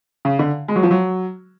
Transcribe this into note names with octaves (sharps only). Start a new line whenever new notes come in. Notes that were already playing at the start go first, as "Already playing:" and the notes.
C#3
D3
G#3
F#3
F3
F#3